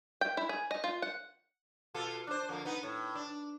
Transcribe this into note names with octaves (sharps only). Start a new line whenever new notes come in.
G5
E4
G#4
D#5
F4
F#5
B2 F4 A4
D4 C5
F2 D3 A#3
B3 D#4
A2
D4